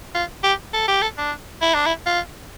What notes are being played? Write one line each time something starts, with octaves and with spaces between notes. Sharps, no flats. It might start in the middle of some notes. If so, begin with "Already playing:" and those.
F4
G4
A4
G4
A4
D4
E4
D4
E4
F4